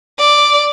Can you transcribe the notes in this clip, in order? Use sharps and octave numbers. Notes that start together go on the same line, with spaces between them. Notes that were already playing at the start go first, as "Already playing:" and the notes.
D5